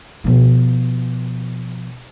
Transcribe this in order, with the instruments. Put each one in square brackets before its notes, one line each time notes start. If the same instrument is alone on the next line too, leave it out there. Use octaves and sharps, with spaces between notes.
[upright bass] B2 F3